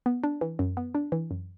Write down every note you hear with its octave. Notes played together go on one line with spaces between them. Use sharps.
B3
D4
E3
F#2
B3
D4
E3
F#2